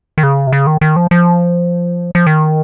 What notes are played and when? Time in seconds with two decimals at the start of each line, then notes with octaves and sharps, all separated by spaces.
0.18 D#3
0.23 C#3
0.47 C3
0.53 C#3
0.67 D#3
0.81 D#3
0.96 F3
1.11 F3
2.15 F3
2.26 D#3